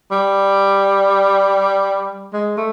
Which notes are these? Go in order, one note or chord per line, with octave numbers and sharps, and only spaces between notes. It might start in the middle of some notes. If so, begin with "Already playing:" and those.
G3
G#3
A3